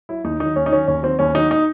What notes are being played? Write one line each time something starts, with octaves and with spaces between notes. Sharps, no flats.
F#3 E4
D#2 D#4
D#3 F#3 D#4
D#2 C#4
D#4
D#3 F#3 C#4
D#2 C#4
D#3 F#3 C4
D#2 C#4
D#3 F#3 D#4
D#4